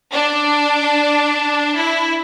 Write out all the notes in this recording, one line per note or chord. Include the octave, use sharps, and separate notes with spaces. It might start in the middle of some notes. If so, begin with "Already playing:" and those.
D4
E4